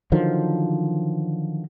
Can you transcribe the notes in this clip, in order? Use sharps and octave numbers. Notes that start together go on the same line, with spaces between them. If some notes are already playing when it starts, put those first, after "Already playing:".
D3 D#3 F3 F#3